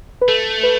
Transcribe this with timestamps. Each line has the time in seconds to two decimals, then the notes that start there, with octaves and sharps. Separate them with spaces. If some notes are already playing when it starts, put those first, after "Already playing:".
0.21 B4
0.28 A3 A4
0.63 B4